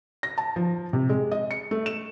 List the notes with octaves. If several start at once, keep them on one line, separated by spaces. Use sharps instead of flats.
A#6
A5
F3
C3
G#3
D#5
C#7
A3
E7